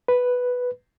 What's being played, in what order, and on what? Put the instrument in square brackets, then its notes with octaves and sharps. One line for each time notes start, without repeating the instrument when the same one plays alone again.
[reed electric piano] B4